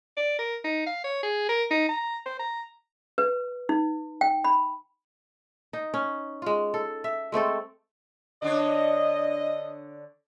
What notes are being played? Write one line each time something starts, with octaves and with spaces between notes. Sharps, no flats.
D5
A#4
D#4
F5
C#5
G#4
A#4
D#4
A#5
C5
A#5
B4
D#4
G5
B5
D#4
C#4
G#3 F4
A4
E5
G#3 A3 C4 A4
D3 D4 C#5 D#5